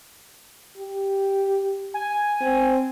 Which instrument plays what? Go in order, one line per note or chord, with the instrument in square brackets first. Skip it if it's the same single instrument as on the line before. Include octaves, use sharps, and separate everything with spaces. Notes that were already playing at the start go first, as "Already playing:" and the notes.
[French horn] G4
[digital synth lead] G#5
[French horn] C4